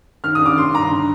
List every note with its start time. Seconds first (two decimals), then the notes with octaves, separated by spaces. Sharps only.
0.24 D#3 F6
0.35 D#6
0.41 D4 D6
0.57 D#3 C6
0.74 G2 A#5
0.91 D3